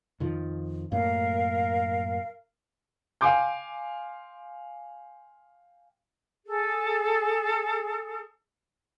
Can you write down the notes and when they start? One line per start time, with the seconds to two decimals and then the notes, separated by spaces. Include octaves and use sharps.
0.20 F2 D#3 F3
0.92 F#2 A2 A#3 A#4 F5
3.21 F5 G5 G#5 C6 D6 G6
6.46 G#4 A4